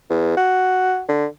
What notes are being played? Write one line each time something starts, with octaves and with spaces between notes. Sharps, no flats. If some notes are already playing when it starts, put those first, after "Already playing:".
E2
F#4
D3